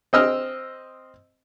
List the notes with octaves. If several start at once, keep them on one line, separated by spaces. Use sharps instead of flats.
C4 D#5 E6 F6